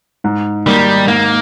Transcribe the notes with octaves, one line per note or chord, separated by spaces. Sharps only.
G#2
D#3 G3 A#3 D#4
G#2 A#3